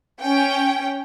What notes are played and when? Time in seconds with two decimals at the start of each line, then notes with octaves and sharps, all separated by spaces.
0.21 C#4 G5